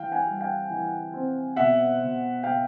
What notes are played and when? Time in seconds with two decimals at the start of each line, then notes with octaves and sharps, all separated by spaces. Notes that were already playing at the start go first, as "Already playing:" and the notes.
Already playing: E3 F5 G5
0.12 F#5 G#5
0.26 G3
0.41 F5 G5
0.70 E3
1.13 C4
1.56 B2 E5 F#5
2.01 B2
2.43 B2 F5 G5